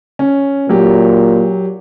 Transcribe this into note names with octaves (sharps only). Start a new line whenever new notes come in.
C#4
A#2 F#3 G4